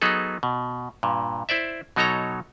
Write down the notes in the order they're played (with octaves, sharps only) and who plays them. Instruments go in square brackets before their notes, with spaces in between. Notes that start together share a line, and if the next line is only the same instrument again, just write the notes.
[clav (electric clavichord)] F#3 B3 D#4 G#4 A4
B2
G2 A#2
E4 C5 D5 E5
B2 F#3 D#4 A4 C#5 A#5